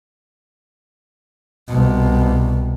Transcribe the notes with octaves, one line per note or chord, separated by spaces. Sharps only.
C2 B2